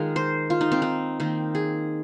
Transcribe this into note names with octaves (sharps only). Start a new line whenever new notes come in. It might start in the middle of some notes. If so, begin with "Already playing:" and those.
Already playing: D#3 G#3 D#4 F4 G#4 A#4
C5
F4
D#4
C4
D#4
D#3 A#3 C4
G#4